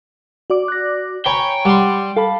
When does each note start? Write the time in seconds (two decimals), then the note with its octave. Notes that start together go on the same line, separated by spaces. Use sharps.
0.50 F#4 D5 D6
0.68 F#6 A#6
1.26 C#5 G5 G#5 A#5 B5
1.65 G3 F#5 C6 D6
2.16 A4 F5 A5 B5